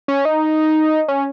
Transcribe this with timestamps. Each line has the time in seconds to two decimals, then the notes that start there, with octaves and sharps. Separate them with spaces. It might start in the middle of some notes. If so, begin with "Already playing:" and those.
0.08 C#4
0.25 D#4
1.08 C#4